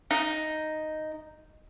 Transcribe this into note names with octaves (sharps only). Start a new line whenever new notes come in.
D#4